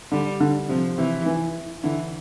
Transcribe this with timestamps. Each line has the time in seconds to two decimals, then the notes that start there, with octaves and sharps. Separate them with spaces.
0.11 D3 G3
0.40 D3
0.69 C3 F3
0.98 C3 E3
1.26 E3
1.83 D3 E3